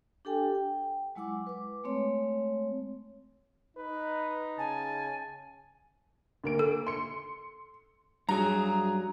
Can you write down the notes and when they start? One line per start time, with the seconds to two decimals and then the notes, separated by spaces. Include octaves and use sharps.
0.25 D4 G4 A4 G5 G#5
0.55 G5
1.16 F#3 G#3 E4 F#5 D6
1.47 B4 D6
1.84 G#3 A3 C4 C#5
3.77 D#4 B4
4.58 C#3 G#5 A5
6.44 D2 A#3 D7
6.59 A4
6.87 C6 C#7
8.29 G2 F#3 G#4 A#5